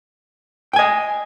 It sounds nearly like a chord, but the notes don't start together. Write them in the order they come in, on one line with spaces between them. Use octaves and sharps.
G5 G#5 D#5